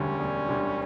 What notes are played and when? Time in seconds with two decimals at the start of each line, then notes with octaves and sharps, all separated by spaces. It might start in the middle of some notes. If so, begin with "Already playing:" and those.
Already playing: E1 D2 D3 G3 C#4
0.19 E1
0.49 D2 D3 G3